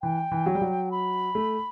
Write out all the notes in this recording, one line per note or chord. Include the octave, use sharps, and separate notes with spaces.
E3 G5
E3
F#3
G3
F#3
B5
A3